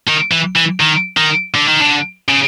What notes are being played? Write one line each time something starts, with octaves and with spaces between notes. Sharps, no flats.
D#3
E3
E3
D#3
D#3
D3
D#3
D3
C#3